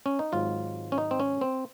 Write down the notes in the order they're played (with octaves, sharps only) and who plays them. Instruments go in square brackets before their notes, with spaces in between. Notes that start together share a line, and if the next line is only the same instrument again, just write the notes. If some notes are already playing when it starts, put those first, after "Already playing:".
[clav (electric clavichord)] C#4
D#4
G#1 G#2 F#3 F4
C#4
D#4
C4
C#4
C4